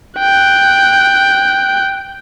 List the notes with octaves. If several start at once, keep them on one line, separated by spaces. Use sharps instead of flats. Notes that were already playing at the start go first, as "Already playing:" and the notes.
G5 F#6